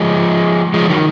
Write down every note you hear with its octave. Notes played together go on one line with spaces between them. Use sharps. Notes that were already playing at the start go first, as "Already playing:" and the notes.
Already playing: F3 G#3
F3 G#3
D#3 F#3